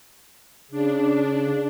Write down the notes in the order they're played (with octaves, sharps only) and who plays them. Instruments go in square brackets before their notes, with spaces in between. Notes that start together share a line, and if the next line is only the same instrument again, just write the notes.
[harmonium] C#3 [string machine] D4